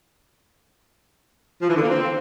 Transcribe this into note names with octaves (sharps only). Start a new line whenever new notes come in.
F3
E3
D3
A#3
C4